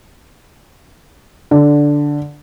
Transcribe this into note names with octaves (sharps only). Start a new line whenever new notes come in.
D3